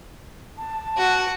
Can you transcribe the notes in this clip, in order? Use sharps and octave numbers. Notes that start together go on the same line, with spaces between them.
A5
F#4